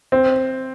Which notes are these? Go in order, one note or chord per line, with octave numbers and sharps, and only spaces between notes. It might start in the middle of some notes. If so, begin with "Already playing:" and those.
C4